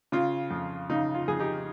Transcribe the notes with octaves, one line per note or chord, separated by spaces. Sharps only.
C#3 F4
F2
C#3 D#4
F4
F2 G#4
D#4 G4